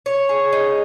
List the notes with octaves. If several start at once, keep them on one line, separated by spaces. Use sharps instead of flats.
C#5
G#4
D#4